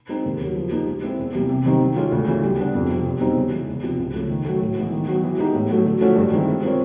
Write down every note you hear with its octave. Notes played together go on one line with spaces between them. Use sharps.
G#3 C4 D#4
D#2
C#3 F#3
F3
A#3 D#4 G4
G#3
C4 E4 G#4 C5
E2
C3 E3 G3 A#3
C3
D#3 G3 C4 D#4
D#3
G#3 C#4 F4
D2
C#3 E3
G3
B3 D4
F2
C3 F3
E2
B2 G3 C4 D#4
C#3
E3 G#3
E2
C3 F3
C#2
C#3 F3 A3
D#3
F#3 A3
A2
E3 G#3 B3
D#3
F#3 B3
E3
G#3 B3 D#4 G4
A2
F#3 A3
D3
F3 A3 C#4 F#4
G2
D#3 G#3 C4 E4
G#3
C4 F4 A#4 C#5